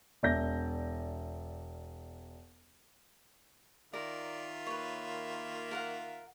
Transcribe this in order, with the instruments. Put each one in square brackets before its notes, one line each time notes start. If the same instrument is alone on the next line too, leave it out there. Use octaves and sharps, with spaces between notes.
[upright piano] E1 D5 E5 G6 A#6
[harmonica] D#3 F4 E5 [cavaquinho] A#4 [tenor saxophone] D5
[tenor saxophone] A#3 [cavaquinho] B4 C#5
[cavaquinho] A#4 F5 F#5